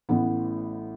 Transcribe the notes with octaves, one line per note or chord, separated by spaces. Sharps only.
A1 A2 E3 B3